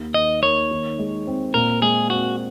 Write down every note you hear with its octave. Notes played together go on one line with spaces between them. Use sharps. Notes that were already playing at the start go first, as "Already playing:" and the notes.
Already playing: D#2
D#3 D#5
A#3 C#5
D#3
G#3
C4
A#2 A#4
G#3 G#4
C4 F#4